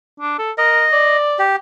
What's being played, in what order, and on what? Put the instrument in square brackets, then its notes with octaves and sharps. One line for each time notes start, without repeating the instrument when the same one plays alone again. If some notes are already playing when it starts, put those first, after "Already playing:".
[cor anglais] D4
A4
[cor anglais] A#4 [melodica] D#5
[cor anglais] D5
[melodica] G4